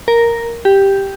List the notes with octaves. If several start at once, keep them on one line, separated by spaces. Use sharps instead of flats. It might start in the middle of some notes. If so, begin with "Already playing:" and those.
A#4
G4